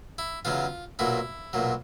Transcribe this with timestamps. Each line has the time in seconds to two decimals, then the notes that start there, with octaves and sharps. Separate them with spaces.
0.18 E4
0.45 E2 C#3 F#3 F4
0.99 B1 A#2 F#3 E4
1.53 B1 A#2 F#3